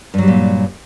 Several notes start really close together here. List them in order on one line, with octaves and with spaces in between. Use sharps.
G2 F#3 G3 A#2